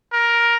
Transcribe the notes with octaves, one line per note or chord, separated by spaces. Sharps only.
A#4